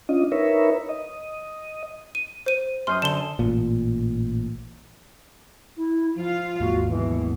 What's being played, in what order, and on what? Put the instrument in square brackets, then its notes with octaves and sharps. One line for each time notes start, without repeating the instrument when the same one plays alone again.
[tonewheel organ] C#4 D4 F4 D#5
D#4 A#4 B4 C#5 E5
D#5
[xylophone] D#7
C5 D#7
[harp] F#2 C5 D#6 [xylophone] C6 F6
[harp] D3 [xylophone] E7 G7
[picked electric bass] A1 A#2
[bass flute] E4
[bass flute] F3 [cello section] F4 F5
[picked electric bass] D#2 G#2 A#3 [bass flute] F#4
[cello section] B2 [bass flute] E3